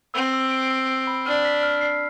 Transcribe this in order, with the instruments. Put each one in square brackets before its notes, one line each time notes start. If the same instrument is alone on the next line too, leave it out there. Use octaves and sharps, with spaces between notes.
[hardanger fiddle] C4 [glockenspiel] E6
[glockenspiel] E6
D7
E6
E6
B5
[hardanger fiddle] D4 [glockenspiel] F6
[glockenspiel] B6
F6
C7